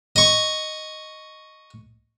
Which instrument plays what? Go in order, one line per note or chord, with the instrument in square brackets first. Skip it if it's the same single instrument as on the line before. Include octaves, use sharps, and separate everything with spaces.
[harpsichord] D#5 C#6